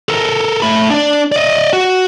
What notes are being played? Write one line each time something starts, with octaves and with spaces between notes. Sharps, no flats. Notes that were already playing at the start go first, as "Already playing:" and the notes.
A4 A#4
A3 B5
D4 D5
D5 D#5
F#4